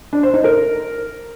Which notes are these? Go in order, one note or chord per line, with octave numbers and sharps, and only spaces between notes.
D4
C5
D#4
A#4